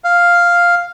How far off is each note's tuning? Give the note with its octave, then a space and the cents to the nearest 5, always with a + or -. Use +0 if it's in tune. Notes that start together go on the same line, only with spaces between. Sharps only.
F5 +0